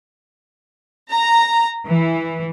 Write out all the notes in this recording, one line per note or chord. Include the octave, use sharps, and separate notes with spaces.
A#5
E3